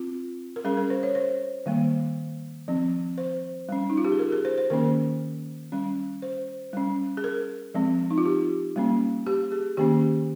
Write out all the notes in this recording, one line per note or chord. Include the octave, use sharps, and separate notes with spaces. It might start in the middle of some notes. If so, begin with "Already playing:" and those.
Already playing: C4 F4
A#4
G3 C#4 G#4
A#4
C5
C#5
C5
D#3 G3 A#3
F3 C4
C5
G3 C#4
D#4
F4
G4
G#4
A#4
G#4
C5
C5
D#3 A#3 C#4 A#4
G3 C#4
C5
G3 C#4
G#4
A#4
F3 G#3 C4
D#4
F4
G4
G3 A#3 C#4
G4
G#4
D#3 A#3 C#4 G4